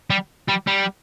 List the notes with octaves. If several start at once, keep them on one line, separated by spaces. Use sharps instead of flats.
G3
G3
G3